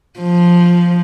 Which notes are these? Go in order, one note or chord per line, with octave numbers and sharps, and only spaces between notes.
F3